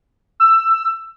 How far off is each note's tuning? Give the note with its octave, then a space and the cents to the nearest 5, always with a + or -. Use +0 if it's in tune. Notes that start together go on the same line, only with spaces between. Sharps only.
E6 +15